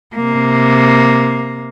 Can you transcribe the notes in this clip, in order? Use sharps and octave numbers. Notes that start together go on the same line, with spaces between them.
C3 A#3